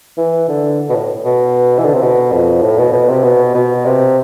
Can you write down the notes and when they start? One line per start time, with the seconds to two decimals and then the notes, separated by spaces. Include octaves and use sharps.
0.17 E3
0.48 D3
0.90 B2
0.95 A2
1.25 B2
1.78 E3
1.85 D3
1.94 C3
2.01 B2
2.32 F2
2.63 A2
2.78 B2
2.93 B2
3.08 C3
3.23 B2
3.55 B2
3.85 C3